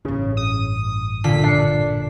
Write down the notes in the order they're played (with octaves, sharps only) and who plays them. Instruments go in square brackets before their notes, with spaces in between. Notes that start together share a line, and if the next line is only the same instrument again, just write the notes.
[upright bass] A1 G2 [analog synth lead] C#3
[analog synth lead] D#6
[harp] A#2 D3 F4 [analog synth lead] B6
[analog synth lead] D4 [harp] C7 C#7